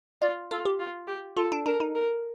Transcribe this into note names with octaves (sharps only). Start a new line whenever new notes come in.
F4 D5
F4 A4
G4
F4
G4
F4 A4
D4
D4 A#4
D#4
A#4